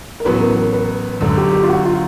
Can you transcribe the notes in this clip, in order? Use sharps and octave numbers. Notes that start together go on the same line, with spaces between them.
A#4
A1 A2 F#3 B3 B4
A#4
A#4
B4
G1 F#2 D3 A4
G4
G4
F4
F#4
F4